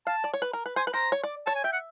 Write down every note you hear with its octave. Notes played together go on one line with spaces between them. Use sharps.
F5 A5
D5
C#5
B4
A#4
B4
C5 G#5
B4
C5 A#5
C#5
D5
C#5 A5
G#5
E5 G5
F#5